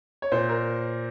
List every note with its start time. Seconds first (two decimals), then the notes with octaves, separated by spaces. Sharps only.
0.22 C#5
0.32 A#2 C5
0.49 A#4